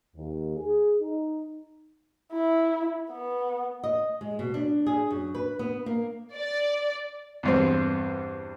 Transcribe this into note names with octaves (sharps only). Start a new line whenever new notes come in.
D#2
G#4
D#4
E4
B3
D#5
G#3
B2
D4
G#4
F#2
B4
B3
A#3
D5
E2 G2 C4